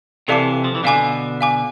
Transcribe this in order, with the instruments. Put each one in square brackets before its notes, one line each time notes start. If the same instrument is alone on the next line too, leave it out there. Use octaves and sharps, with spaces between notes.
[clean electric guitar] C3 E3 [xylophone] A4 D5 F5 A5 D6
[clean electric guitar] F3
E3
[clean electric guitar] B2 D3 [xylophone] F5 G#5 D6
[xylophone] F5 G#5 D6